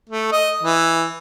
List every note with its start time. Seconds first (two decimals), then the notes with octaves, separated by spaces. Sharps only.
0.09 A3
0.32 D#5
0.63 E3